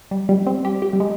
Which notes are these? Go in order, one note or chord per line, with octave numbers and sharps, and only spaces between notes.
G3
G3
C4
G4
G4
G3
G#3